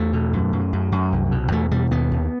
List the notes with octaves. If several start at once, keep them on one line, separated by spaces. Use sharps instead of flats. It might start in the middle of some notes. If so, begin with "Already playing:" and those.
Already playing: E2 A3
B2
F#2
F#2
F#2
F#2
C2
B2
E2 A3
B2 G3
D#2 B3
D#2